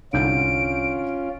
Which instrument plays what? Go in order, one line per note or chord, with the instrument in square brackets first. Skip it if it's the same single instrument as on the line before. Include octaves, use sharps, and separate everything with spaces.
[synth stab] C2 [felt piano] G#2 D3 G6 [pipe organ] C#4 F4 [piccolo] D7